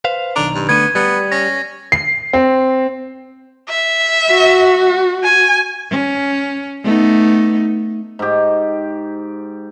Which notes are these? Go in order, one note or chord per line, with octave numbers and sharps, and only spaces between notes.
B4 C5 F5
B1 D#3 D4 A#5
G2
D3 A3 B3 D4 G#6 D#7
G3 B3
C#4 A#6
C7
C4
E5
F#4
G#5
C#4
A3 B3 D#4
G#2 G4